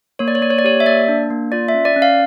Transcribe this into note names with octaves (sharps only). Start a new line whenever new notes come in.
A#3 C#5
D5
C#5
A#3 D5
C#5
D5
G4 C#5
E5
A#3 D5
D4
A#3
F4 D5
E5
C#4
D5
C#4
F5